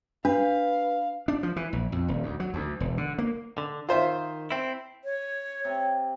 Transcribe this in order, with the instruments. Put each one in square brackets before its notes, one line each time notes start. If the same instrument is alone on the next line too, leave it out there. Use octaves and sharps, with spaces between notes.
[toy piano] D4 [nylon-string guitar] B4 [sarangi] F5
[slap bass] D4
F3
E3
A#1
F2
D#1
D2
F#3
D2
E1
D3
A#3
[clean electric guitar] D3
[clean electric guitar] D#3 [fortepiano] F4 C5 E5
[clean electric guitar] C4 E4
[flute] C#5
[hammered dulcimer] C3